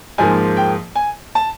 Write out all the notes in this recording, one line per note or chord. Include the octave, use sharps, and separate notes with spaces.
G#2 F3 A#3 G#5
G5
G#5
A5